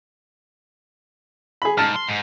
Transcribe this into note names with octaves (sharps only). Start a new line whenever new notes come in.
G#4 B5
G#2 A5 F6
C6
G#2